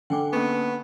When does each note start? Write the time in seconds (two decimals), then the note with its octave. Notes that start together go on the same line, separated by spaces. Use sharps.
0.10 D3 G5 G#5 D6
0.33 A#3 B3 C#4 C#6